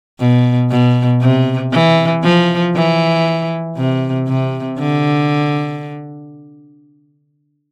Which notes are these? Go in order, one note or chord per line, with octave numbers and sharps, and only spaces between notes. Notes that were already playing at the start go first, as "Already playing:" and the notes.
B2
B2
C3
E3
F3
E3
C3
C3
D3